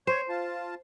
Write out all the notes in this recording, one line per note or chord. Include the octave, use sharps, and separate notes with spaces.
C5 C#5
F4 A5